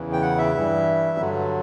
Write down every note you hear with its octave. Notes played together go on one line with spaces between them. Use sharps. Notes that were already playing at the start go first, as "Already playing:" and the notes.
Already playing: E2 C#3 E3
G5
F#5
E5
G2 E3 G3
G2 D3 F#3